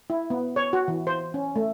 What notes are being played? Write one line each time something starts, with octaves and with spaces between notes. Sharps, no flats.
E4
B3
C#5
F#4
E3
C5
C#4
A3